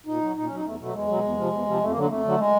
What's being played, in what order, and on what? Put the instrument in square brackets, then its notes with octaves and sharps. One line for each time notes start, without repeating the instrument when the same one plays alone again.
[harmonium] A#2 D#4
F#3
A#2 D#4
F#3 C#4
D#4
E2 A3
B2 F#3 A3
E2 G#3
B2 F#3
E2
C3 F3
E2
C3 F3
F2 A3
A#3
D3 F#3
A#3
F2 A3
D3 F#3
G#3